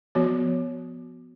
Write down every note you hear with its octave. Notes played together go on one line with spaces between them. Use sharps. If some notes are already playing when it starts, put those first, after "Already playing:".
F3 B3 F#4 C#5